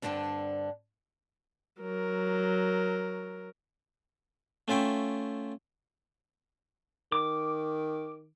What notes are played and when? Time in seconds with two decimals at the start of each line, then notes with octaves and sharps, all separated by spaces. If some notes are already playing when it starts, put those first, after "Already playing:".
0.02 G2 D3 B3 C4 D4
1.81 F#3 A#4
4.68 A3 C#4 F4 E5 G5
7.12 D#3 D6